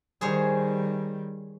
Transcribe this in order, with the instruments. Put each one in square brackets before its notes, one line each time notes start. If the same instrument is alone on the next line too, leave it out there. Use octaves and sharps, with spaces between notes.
[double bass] D#3 G3 [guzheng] G#4 C5 C#5